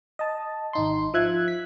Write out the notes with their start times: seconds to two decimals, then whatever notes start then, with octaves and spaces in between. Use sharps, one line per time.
0.19 D#5 A5
0.73 G#1 D#4 C6
1.14 F3 E5 F#6 G#6
1.48 B6